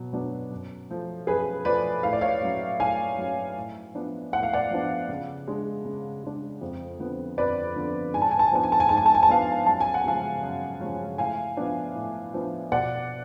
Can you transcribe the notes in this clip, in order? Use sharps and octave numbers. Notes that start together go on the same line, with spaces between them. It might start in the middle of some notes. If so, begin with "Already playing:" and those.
Already playing: B2 F#3
F#3 B3 D4
F#2
F3 A3
F#2 G#4 B4
F3 A3 B4 D5
A2 F5
D5
C#5 F5
F#3 C#4
A2 F5 G#5
F#3 C#4
A2
F3 B3 D4
A2 F#5
F5
D5 F#5
F3 B3 D4
C#3
G#3 D4
C#3
G#3 D4
F2
D3 F3 B3
F2 B4 D5
D3 F3 B3
G#2 G#5
A5
G#5
A5
G#5
F3 B3 D4 A5
G#5
A5
G#5
G#2 A5
G#5
A5
G#5
A5
F3 B3 D4 F5 G#5
F#2 A5
G#5
F#5
C#3 F3 G#3 C#4 F5 G#5
F#2
C#3 F3 G#3 C#4
A2 F5 G#5
F3 B3 D4
A2
F3 B3 D4
B2 D5 F#5